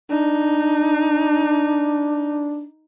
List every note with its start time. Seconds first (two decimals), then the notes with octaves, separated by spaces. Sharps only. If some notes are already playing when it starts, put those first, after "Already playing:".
0.11 D4 D#4